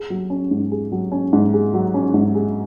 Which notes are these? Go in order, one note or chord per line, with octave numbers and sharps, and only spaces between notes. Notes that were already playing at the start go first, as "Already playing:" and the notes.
Already playing: G#4
F#3
C#4
G#2
G#4
F#3
C#4
G#2
G#4
F#3
C#4
G#2
G#4